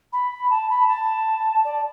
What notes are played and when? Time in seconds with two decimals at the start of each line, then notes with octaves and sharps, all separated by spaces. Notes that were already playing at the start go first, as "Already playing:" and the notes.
0.12 B5
0.50 A5
0.69 B5
0.88 A5
1.64 D5